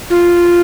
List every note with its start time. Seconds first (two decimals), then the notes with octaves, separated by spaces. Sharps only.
0.10 F4